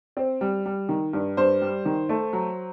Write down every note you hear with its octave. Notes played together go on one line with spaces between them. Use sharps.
C4
G3
G3
D#3
G2
G2 C5
G3
D#3
A3
F#3